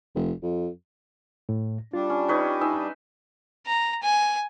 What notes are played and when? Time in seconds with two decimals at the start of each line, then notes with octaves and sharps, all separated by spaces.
0.15 F1
0.42 F2
1.49 A2
1.93 G3 D4 F4
2.10 C#4
2.28 D#4 B4 C#5
2.61 D#4 E5 G#5
3.67 A#5
4.03 G#5